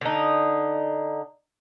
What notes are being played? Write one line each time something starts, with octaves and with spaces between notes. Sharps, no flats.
D3 D#4